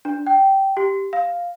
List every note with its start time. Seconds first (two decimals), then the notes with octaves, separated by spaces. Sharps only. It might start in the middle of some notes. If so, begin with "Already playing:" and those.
0.05 D4
0.27 G5
0.77 G4
1.13 F5